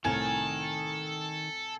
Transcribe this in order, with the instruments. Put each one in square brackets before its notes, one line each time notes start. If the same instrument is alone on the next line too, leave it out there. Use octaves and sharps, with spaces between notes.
[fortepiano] C2 A2 [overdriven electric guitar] D#3 A#4 [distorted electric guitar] A4 [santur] G#5